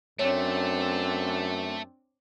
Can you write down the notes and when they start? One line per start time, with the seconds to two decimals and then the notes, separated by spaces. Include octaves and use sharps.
0.19 F#2 A3 C4 D4 C#5